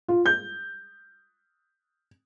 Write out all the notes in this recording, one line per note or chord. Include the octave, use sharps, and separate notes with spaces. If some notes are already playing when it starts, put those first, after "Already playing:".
F4
G6